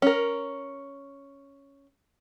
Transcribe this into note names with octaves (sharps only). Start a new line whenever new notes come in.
C#4 A#4